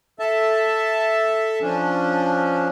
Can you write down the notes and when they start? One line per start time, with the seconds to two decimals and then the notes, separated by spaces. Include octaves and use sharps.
0.19 A4 E5 A5
1.62 F3 C#4 D4